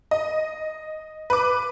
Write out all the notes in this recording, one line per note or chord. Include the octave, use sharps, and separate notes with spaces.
D#5
B4 D6